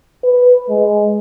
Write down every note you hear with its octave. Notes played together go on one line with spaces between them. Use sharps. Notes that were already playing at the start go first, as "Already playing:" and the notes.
B4
G#3